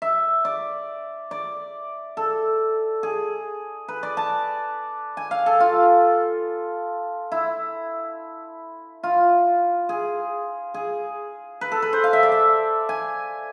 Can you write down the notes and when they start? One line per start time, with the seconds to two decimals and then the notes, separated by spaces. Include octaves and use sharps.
0.02 E5
0.45 D5
1.31 D5
2.17 A4
3.03 G#4
3.88 B4
4.03 D5
4.17 A5
5.17 G#5
5.31 F5
5.46 A4
5.60 F4
7.32 E4
9.03 F4
9.89 G#4
10.74 G#4
11.61 B4
11.72 A4
11.82 B4
11.93 C5
12.04 F5
12.13 E5
12.23 D5
12.32 E5
12.89 G#5